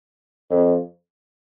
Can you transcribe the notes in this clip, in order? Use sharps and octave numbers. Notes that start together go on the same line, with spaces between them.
F2